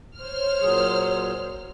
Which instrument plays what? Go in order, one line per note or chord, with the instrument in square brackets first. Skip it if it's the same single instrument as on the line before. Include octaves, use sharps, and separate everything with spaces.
[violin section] C5 C#5 F6
[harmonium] A#2 F#3 G#4